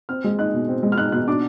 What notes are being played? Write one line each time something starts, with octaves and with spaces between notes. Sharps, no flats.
C4 F6
G#3
D#4 F#6
B2
C4
G#3
F6
D#4 F#6
B2 F#6
D4 D6